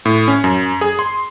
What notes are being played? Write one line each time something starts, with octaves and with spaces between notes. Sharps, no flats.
A2
C#4
F#2
G#4
C6